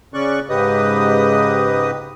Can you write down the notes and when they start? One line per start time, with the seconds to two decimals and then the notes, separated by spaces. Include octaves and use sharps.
0.14 C#3 C#4 D5 C#6 F#6
0.50 G#2 C#3 G4 B4 D#5 D#6